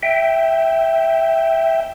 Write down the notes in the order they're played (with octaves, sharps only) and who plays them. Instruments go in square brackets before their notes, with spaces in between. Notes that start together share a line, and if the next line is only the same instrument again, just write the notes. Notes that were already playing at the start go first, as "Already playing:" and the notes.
[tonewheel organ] E5 G5